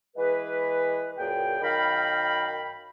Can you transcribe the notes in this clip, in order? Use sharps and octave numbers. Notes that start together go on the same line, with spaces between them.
E3 G#3 G#4 B4
F#2 A#2 G#4 G5
F#2 D#3 A#4 F5 G5 B5